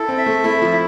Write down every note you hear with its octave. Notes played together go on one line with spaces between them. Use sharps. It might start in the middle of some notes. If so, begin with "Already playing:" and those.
Already playing: E4 A4
C4
E5
A3
A3 E4
F3
E4